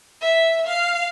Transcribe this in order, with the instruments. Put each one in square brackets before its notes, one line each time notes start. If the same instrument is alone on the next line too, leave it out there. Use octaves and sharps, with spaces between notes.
[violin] E5
F5